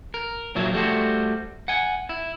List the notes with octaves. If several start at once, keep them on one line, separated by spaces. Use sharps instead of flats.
A#4
A#2 F3 F#3 A#3 E4
G3 A3 F#4 C5
F#5 G#5
E4